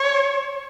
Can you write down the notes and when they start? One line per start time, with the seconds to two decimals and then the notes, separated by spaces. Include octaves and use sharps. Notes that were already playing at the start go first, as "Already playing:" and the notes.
Already playing: C#5